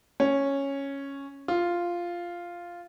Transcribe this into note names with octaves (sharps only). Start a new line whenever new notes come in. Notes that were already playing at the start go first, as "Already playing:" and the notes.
C#4
F4